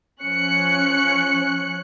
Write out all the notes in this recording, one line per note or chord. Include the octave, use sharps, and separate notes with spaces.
F3 C#4 F#6 C#7